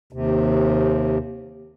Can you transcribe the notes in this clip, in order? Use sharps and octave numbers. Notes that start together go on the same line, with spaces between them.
D#2 C3